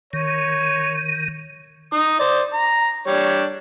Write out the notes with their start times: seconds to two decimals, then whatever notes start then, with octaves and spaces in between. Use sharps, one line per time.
0.13 D#3 C#5
1.93 D#4 D#6
2.20 C5 D5
2.54 A#5
3.07 G3 D4 C#5